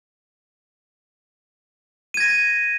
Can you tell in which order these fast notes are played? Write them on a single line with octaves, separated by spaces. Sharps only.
D#7 G#6 A#6